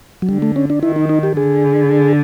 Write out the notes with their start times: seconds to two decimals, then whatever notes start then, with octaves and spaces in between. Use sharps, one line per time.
0.22 F#3
0.29 D3 G3
0.42 A3
0.56 C#4
0.70 D4
0.83 D#3 E4
0.96 D#4
1.09 D#4
1.23 G4
1.37 D3 G#4